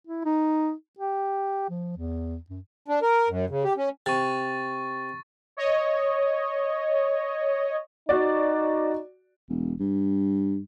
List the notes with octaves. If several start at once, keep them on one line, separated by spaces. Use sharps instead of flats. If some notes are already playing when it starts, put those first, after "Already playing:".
E4
D#4
G4
F3
E2
F#2
D4
A#4
F#2
C#3
G4
C#4
C3 C#6 A6
C#5 D#5
D#4 F#4 D5
E1
G2